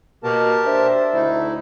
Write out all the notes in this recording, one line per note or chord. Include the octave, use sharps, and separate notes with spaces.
B2 A#3 G4 A#4 A5
D4 C5 E5
D2 A3 D#4 E4